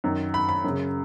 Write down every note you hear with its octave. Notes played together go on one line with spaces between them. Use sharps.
F#2 D#3
B5
B5
F#2 C#3